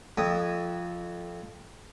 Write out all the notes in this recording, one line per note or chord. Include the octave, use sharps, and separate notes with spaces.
F2 D#6